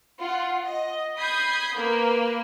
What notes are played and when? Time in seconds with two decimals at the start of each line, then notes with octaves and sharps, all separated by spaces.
0.18 F4 F#5
0.62 D#5
1.17 B5 D#6 G6 G#6 C7
1.76 A#3 B4